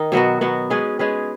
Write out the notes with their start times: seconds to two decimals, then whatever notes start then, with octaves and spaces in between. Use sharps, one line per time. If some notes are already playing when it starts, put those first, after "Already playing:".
Already playing: D#3 D#4
0.12 B2 F#3 B3 F#4
0.41 B2 F#3 B3 F#4
0.70 G#3 C#4 G#4 B4
0.99 G#3 C#4 G#4 B4